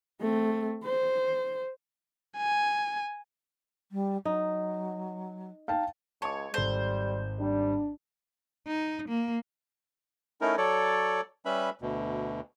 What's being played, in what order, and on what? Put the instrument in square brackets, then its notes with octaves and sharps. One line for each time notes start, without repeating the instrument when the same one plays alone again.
[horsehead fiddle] A3 C4
C5
[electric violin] G#5
[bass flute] G3
[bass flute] F#3 [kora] D#4
[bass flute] D#4 [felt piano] F5 G5 A5
[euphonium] C#2 [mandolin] C#5 [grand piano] A5 C#6 D6
[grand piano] G#1 A4 [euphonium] G3 [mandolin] C5
[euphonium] G3 [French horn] D4
[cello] D#4
A#3
[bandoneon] A3 C#4 D#4 E4 A#4
F#3 A4 C#5 D5
G3 C#4 B4 E5 B5
D2 B2